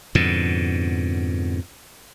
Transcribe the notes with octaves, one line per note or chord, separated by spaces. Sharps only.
F2 G#2 B2 D3